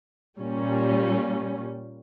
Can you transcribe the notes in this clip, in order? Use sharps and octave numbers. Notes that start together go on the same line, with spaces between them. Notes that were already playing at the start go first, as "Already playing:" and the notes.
A#2 G3 C#4